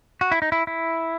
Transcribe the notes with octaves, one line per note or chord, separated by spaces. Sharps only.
F#4
E4
D#4
E4
E4